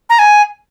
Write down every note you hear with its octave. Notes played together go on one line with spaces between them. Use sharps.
A#5
G#5